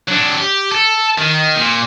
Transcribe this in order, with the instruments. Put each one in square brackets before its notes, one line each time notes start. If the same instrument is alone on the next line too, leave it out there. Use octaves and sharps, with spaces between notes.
[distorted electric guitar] F#3 D4
G4
A4
D#3
A#2